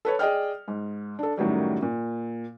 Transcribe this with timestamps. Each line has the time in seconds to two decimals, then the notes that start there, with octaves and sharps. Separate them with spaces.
0.05 A4 B4 C#5
0.19 G#4 D5 D#5 G5 F6
0.68 G#2
1.19 D4 A4
1.37 F#2 A2 D#3 F#3 G3
1.82 A#2